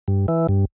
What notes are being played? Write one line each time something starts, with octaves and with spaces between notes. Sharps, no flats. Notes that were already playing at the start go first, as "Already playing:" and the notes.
G2
E3
G2